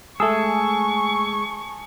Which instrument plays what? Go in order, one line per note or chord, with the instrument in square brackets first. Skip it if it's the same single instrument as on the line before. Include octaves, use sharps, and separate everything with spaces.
[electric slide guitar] G#3 G#4 [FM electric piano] A3 E6 [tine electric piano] G#5 A5 D#6 [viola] C#6